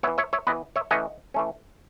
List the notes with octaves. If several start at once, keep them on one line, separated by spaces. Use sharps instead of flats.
E3 B3 C#5 E5
C#5 E5
C#5 E5
E3 B3 B4 D#5
C#5 E5
E3 A3 C#4 D#5 F#5
E3 A3 C#4